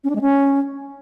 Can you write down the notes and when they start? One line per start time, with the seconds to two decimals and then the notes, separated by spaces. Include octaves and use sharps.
0.04 C#4
0.10 D4
0.15 G#3
0.21 C#4